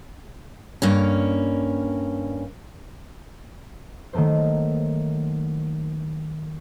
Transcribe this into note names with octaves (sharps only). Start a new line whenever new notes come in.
G2 A#3 C#4
D#3 F#3 A3 A#3 C5